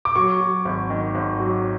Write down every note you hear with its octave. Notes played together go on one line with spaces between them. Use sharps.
D6
F#3 C#6
F#3
G#1
D#3
G#1
F#3